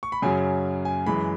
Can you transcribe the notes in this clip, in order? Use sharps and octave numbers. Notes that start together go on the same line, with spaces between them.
C#6
B5
F#2 C#3 F#3 G#5
G#5
F#2 E3 G#3 B5